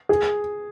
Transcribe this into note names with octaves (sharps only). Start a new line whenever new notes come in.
G#4